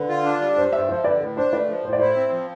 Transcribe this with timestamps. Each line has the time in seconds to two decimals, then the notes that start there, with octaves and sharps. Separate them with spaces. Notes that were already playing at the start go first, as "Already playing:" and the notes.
Already playing: D3 B4
0.09 F4
0.24 D4
0.41 G3
0.56 G2 C5
0.72 G2 C5 E5
0.89 F3 C5 E5
1.04 D3 B4 D5
1.20 A2 B4
1.37 D4 C5
1.52 A3 B4 D5
1.68 F3
1.84 A2 C5
1.93 D5
2.00 E4 C5
2.16 C4
2.32 F3